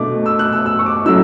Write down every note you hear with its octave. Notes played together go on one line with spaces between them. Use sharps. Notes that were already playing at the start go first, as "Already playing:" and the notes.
Already playing: B2 A3 D4 D6
E6
F#6
E6
E6
C#6
D6
A2 F#3 C#4 E4 E6